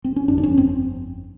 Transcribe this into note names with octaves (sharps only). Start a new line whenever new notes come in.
C4
C#4
G1 F2 D3 D4
D4
C#4
C4